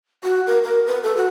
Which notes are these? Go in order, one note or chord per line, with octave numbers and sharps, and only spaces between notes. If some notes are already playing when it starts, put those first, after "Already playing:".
F#4
A#4
A#4
B4
A4
F#4